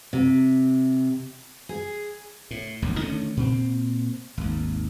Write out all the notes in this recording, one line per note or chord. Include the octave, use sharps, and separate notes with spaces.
C3
G#4
A2
E1 A#1 E2
D3 D#3 A3 C#4
A#2 C4
G#1 D#2